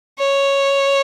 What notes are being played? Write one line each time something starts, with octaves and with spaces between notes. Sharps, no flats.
C#5